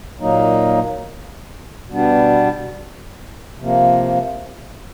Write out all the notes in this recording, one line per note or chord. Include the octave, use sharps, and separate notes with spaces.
A#2 F#3 A#3 D#4
B2 G3 B3 D4
C3 F3 A#3